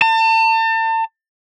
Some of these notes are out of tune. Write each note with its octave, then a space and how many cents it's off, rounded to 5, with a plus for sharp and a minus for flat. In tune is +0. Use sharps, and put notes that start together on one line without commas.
A5 +35